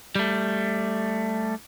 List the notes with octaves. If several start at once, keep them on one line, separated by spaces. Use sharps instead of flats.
G3 A3